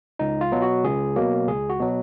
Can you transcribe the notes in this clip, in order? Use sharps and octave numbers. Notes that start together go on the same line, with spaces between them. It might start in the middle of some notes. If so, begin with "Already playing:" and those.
C#2 D#4
F4
B2 F#3
F#4
C#2 G#4
B2 F#3 A#3
C#2 G#4
F#4
B2 F#3